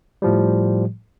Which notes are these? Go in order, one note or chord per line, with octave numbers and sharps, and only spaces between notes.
A2 F3 G3